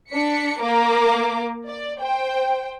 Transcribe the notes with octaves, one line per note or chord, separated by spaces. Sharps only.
D4 B6 C#7
A#3 A#4 D6
D5
C5 G5